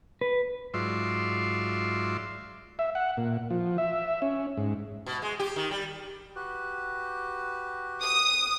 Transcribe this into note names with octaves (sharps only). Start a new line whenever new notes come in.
B4
G#2 F#3 F4 D5 E5 C6
E5
F#5
A#2
F3
E5
C#4
G#2
B2
G#3
G4
D#3
G3
F#4 G4 B4
D#6